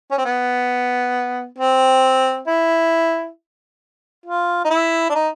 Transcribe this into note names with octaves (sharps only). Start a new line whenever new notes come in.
C#4
C4
B3
C4
E4
F4
D#4
E4
D4
D#4